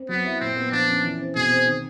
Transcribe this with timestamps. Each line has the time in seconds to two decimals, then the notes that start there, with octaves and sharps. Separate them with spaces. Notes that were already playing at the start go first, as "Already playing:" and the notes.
Already playing: C4
0.09 F#3 B3
0.25 E4
0.40 A#2 C4
0.56 B3
0.72 F3 D4
0.88 C#4
1.03 E3
1.20 C4
1.35 B2 G#4
1.50 C4
1.67 D#3